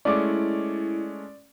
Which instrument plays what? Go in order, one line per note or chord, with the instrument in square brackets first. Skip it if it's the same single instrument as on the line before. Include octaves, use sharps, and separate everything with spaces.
[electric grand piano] G#3 A3 C#4 [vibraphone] E4 [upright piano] D5 D6